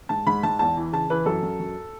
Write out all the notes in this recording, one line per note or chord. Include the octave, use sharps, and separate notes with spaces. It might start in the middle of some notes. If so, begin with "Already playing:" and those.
G#2 A5
G#2 B5
G#2 A5
E2 A5
E3
C#3 A5
E3 B4
F#2 A4
F#2
F#2